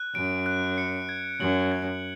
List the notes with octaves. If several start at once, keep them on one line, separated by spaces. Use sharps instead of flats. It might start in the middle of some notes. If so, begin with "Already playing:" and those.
Already playing: F#6
F#2 D7
F#6
C#7
G#6
F#2 F#7
G#6